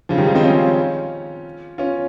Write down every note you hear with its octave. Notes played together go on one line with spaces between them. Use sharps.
C#3 F3
D#3 G3
F3 G#3
C4 D#4
C#4 F4
C#4 F4